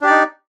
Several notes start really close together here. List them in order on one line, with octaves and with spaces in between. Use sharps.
D4 G4 D5 D#4